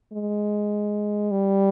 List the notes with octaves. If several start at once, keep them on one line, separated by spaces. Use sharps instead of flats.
G#3
G3